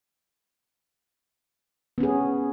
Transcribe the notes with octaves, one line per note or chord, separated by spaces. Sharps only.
B3 C#4 G#4